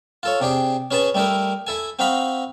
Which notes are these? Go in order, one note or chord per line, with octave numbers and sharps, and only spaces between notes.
F4 A4 C#5
C3 D4 G4 G#4
C#4 G#4 B4 G#5 A5
G3 A3 D#4 E4 A#4
E4 A4 G#5
C4 D#4 F#4 F5 A#5 B5